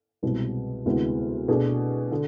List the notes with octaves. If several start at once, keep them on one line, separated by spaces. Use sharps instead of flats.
C2 B2 G#3 C4
D2 C3 G#3 B3 E4
B2 A3 D4 G#4
D3